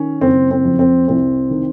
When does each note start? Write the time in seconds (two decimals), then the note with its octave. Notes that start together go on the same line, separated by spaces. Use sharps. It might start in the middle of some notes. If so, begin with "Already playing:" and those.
Already playing: D#3 C#4
0.21 F#1 C4
0.51 C4
0.65 F2
0.79 C4
1.08 C2 C4
1.50 D#3